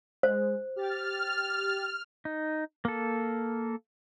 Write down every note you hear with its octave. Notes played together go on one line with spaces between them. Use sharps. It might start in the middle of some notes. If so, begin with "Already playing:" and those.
G#3 C5
G4 F6 A6
D#4
A#3 A4